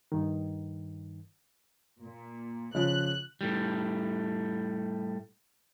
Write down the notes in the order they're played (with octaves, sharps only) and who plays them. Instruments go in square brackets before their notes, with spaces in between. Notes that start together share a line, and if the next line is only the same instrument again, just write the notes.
[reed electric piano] G2 D#3
[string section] A#2
[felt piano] C#3 F3 [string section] F#6
[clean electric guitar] A2 G3